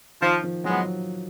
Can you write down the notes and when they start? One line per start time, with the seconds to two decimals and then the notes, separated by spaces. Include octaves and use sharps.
0.21 D#3 F3
0.43 F3
0.64 F#3 G#3
0.69 B3